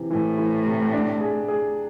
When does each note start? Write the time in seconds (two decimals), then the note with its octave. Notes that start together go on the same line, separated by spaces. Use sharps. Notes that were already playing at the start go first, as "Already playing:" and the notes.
Already playing: C3 E3 C4
0.10 A2 E3
0.38 E3
0.66 C3
0.93 D4
1.20 G#4
1.48 G#4